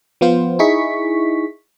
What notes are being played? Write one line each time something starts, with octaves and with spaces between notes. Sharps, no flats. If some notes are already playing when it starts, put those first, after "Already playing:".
F3 B3 F4 C5
D#4 E4 G#4 C#6 B6